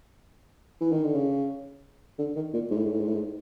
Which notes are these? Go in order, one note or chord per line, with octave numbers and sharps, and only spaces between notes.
E3
D#3
D3
C#3
D3
D#3
A#2
G#2
A2
G#2
A2
G#2
A2
G#2